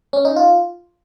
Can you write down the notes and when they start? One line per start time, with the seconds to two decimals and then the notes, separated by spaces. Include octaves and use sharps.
0.13 C#4
0.25 D#4
0.36 F4